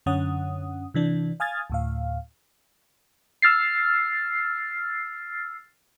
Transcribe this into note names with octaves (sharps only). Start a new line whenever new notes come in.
F#2 D3 C#4 F#5 D#6
C3 E3 D4
F5 G#5 D#6 F6 G#6 A6
D2 A2 F5
E6 F6 A6 C7